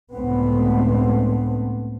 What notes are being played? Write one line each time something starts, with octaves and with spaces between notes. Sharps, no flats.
C#2 A2 D3 A3 B3 C4